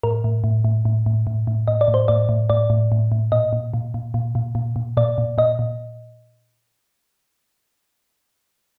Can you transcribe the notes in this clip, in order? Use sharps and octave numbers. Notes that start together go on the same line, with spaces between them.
A2 A#4
A2
A2
A2
A2
A2
A2
A2
A2 D#5
D5
A2
C5
A2 D5
A2
A2 D5
A2
A2
A2
A#2 D#5
A#2
A#2
A#2
A#2
A#2
A#2
A#2
A#2 D5
A#2
A#2 D#5
A#2